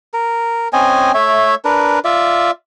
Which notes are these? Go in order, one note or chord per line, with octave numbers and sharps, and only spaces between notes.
A#4
C4 C#4 D#5 G#5
A3 C#5 E5
D4 A#4 B4
F4 D5 E5